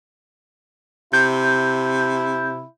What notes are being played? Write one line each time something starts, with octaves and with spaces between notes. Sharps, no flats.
C3 E4 G6